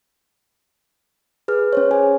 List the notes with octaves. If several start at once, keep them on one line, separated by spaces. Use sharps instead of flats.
G#4 B4 F6
C#4 C5 C#5
G#4 C#5 G#5